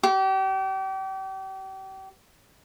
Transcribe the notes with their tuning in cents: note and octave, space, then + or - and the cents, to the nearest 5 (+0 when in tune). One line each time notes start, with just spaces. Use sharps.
G4 -35